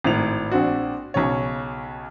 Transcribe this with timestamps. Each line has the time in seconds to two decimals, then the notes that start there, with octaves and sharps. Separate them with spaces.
0.04 G#1 A2 F7
0.51 A#1 C4 D4 F#4
1.14 B1 C#3 C#5